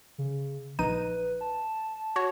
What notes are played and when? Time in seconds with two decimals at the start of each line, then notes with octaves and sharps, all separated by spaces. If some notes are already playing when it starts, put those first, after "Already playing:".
0.18 C#3
0.79 A#1 D#4 B4 D#7
1.41 A5
2.16 F#4 C#5